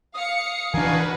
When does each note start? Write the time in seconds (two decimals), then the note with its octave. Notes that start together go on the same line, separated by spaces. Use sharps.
0.14 F5 D#6 C#7
0.74 E3 D4 F#4 A#4 B4 F5 G#5